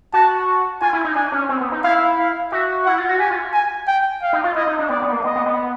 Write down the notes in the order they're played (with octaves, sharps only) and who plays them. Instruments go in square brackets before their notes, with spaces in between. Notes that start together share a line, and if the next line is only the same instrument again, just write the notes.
[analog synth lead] F#4 [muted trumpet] A5
[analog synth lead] F4 [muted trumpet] G#5
[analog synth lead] E4
D#4
[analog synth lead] D4 [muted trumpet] G#5
[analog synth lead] C#4
C4
B3
D#4
[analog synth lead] E4 [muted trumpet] F5
[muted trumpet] F5
[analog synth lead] F#4 [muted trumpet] E5
[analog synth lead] E4 [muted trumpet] F#5
[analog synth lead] F4
F#4
[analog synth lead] G4 [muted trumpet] G#5
[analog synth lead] F4
[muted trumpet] G#5
G5
F5
[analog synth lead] D#4
F4
[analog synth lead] E4 [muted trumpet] D#5
[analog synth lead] D#4
D4
[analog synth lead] B3 [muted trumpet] D5
[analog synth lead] B3
A#3
[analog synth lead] B3 [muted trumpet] D#5
[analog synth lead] B3
B3